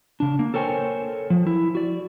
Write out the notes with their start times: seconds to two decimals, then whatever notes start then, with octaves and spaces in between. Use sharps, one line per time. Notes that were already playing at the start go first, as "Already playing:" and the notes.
0.20 C#3 D4
0.39 A#3
0.54 A4 A#4 C5 C#5 G5 G#5
1.30 F3
1.47 E4
1.75 F#4 D5